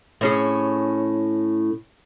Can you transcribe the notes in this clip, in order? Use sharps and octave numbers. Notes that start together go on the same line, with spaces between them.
A2 C#4 G#4